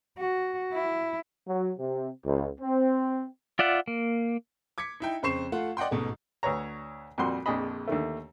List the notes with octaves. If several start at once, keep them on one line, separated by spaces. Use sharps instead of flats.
F#4
E4
F#3
C3
C#2
C4
F4 D5 E5 F#5
A#3
D6 G#6 B6 C#7
D#4 E4 G5
F2 C#3 C5 C#6 C7 E7
A3 F4 F#5
D5 D#5 F#5 G5 C6
A1 G#2 B2 G#3 A3
D2 B4 C#5 A#5
F2 A#2 G3 F#4 C6
A#1 F2 D4 G#4 D#5 B5
D#2 D3 D#3 A3